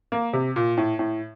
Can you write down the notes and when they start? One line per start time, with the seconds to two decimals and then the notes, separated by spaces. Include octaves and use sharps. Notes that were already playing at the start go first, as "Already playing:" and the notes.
0.12 A#3
0.33 C3
0.56 A#2
0.77 A2
0.99 A2